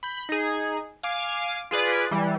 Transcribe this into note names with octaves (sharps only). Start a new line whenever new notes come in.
B5 G6
D#4 G#4
F5 G#5 D6
F4 G#4 B4 D5
E3 G3